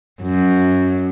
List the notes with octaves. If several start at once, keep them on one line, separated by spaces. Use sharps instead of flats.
F#2